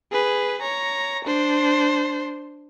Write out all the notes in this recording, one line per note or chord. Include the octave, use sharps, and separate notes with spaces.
G#4 B4
C#5 A#5
D4 C5